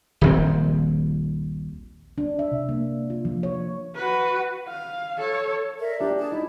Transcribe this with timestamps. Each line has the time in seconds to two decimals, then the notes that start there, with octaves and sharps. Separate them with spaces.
0.21 D#1 A#1 C4
2.18 D4
2.39 E5
2.52 C3
2.69 A#3
3.10 F4
3.25 F3
3.43 C#5
3.95 F#4 B4
4.67 F5
5.18 A4 C#5
5.79 A#4 D5 E5
6.00 D4 G4
6.18 G#4 D5 A5
6.32 D#4 E4